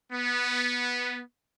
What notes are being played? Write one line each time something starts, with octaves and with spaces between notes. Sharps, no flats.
B3